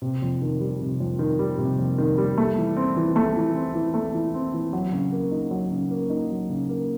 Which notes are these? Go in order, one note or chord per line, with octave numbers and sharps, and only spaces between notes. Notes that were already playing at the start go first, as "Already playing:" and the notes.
C3
F2
D#3
G3
C3
F2
D#3
G3
C3
F2
D#3
G3
A3
E3
C4
E3
A3
E3
C4
E3
A3
E3
C4
E3
F#3
C#3
A#3
D#4
F#3
C#3
A#3
D#4
F#3
C#3
A#3